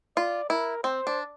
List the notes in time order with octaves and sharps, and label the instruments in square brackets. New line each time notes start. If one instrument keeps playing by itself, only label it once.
[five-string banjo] F4 [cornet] D5
[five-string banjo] E4 [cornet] A#4
[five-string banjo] C4 [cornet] C5
[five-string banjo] D4